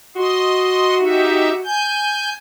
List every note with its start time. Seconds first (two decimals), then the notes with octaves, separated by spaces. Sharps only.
0.16 F#4 D#5 C6
0.99 D#4 G4 E5
1.64 G#5 G6